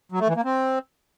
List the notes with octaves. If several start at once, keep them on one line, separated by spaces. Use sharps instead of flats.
F#3
A3
E3
A#3
C4